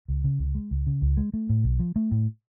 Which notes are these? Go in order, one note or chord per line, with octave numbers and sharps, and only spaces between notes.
C#2
C#3
C#2
G#3
C#2
C#3
C#2
G#3
A3
A2
B1
F3
A3
A2